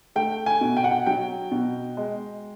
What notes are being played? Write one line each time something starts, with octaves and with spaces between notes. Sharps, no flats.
A3 G5
G#5
B2
G5
F#5
G5
F#3 G5
B2
G#3